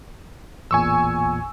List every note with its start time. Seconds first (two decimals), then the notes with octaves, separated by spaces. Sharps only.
0.71 A1 E2 A#2 G#5 C#6 E6